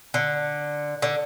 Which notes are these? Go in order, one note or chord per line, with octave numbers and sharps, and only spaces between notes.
D3
D3